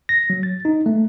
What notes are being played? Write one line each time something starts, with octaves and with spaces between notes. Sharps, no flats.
A#6
F#3
A6
D#4
A3